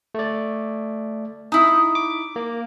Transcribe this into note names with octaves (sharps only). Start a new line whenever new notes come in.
A3 D5
D#4 E4
D6
A#3